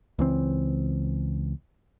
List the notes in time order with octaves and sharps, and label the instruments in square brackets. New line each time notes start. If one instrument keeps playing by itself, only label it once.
[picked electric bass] C#2 E3 C4